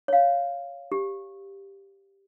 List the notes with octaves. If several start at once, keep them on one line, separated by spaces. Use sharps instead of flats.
C#5 F5
G4